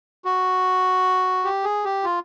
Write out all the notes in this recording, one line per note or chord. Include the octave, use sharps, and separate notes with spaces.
F#4
G4
G#4
G4
F4